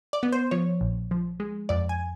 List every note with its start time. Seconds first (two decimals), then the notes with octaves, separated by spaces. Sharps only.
0.13 D5
0.23 B3
0.32 C5
0.51 F3 C#5
0.81 A#1
1.11 F3
1.40 G#3
1.69 F2 D5
1.89 G#5